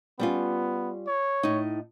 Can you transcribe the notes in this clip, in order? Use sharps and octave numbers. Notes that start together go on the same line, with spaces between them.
G3 B3 C#4 F4
C#5
A2 D#4